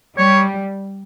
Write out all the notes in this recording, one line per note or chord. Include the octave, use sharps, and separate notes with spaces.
G3 C#5